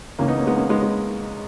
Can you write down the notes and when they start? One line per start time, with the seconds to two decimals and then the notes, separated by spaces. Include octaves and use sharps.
0.19 C#2 C#3 E3 A#3 C#4
0.28 B3 D#4
0.38 A#3 C#4
0.47 G#3 B3
0.56 A#3 C#4
0.70 G#3 B3
0.83 G#3